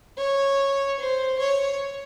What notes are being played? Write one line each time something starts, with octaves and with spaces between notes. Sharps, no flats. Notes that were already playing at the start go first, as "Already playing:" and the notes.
C#5
C5
C#5